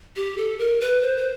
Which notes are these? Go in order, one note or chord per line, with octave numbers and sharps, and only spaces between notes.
G4
A4
A#4
B4
C5
C5